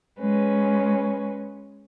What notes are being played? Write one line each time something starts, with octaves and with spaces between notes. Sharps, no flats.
G#3 C#4 B4